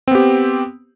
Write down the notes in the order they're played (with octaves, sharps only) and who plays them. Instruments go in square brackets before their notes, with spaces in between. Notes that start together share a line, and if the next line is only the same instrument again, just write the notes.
[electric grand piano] C4
B3
G4